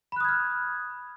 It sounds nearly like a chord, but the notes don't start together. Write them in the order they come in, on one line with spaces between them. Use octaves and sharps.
B5 F#6 D#6 G#6 F6